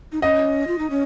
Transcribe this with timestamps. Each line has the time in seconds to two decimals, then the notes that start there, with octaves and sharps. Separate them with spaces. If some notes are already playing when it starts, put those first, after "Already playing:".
0.12 D#4
0.22 C#4 D#5
0.67 F4
0.78 D#4
0.90 C#4